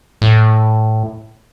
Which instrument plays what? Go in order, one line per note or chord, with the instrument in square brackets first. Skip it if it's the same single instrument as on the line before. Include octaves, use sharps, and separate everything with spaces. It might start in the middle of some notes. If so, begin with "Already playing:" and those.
[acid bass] A2